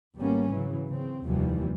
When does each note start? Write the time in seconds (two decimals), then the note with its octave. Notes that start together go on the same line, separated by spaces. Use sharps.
0.17 G#1 G3 A#3 B3 C#4
0.53 C#3 E3 F#3
0.91 C#3 C4
1.26 F1 D#2 E3 F3 G3